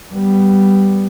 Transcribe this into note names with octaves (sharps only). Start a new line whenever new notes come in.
G3 B3